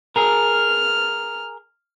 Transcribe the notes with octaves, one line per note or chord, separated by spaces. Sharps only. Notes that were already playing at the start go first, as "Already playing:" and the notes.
G#4 A#4 F6